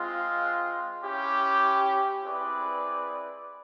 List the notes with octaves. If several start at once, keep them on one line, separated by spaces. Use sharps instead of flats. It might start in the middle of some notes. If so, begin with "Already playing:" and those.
Already playing: G#3 C4 F4
C#4 E4 G4
C4 E4 G#4 B4 D5